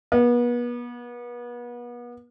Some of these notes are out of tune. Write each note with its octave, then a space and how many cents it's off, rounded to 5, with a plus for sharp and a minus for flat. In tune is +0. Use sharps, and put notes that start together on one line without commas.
B3 -35